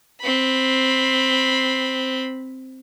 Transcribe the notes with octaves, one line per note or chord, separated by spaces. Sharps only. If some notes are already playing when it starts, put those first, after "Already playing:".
C4 B5